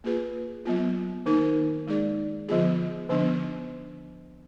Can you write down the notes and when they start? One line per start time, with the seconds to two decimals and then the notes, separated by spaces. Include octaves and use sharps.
0.04 A#3 F4 G#4 B4
0.65 F#3 B3 F4
1.26 D#3 A#3 D#4 A#4
1.87 G#3 D#4 G#4 D5
2.49 D3 F3 B3 F4 G#4
3.09 D3 F3 B3 D4